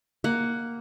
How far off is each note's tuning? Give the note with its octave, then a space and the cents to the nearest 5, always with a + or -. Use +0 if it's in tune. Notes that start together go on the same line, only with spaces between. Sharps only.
A#3 +0 F#5 +10